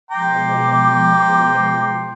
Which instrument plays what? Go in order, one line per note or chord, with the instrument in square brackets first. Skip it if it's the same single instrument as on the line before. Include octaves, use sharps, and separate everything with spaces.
[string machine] B2 F3 G#3 [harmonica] G5 A#5 C6 [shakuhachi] D6